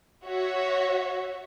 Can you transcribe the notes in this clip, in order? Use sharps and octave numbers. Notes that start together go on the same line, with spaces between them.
F#4 C#5 E5